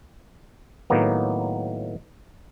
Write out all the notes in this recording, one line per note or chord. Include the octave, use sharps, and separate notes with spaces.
A2 D#3 F#3 A#3 B3